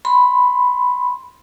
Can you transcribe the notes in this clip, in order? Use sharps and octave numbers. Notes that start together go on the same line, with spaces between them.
B5 C6